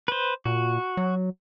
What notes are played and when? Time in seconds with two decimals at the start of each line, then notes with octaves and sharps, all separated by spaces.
0.08 B4 C5
0.45 A#2 F#4
0.97 F#3